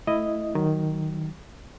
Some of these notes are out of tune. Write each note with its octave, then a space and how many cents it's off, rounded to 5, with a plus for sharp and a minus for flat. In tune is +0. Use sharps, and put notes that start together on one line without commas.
A3 +0 E4 +5 D#5 +0
D#3 +0 F#3 +20